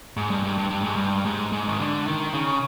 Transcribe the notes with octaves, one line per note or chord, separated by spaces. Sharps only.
G#2
G2
G2
G2
G2
G#2
G2
G#2
G#2
D#3
D3
D#3
C#3